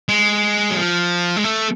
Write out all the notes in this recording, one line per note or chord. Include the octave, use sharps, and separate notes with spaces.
G#3
F#3
F3
G#3
A3